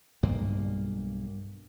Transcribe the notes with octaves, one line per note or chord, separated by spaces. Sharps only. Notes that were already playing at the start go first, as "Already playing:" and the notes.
B1 G2 A#3